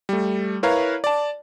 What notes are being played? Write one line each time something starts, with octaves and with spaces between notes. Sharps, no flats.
G3 A3
E4 A#4 B4 C#5 F5 A#5
D5 A5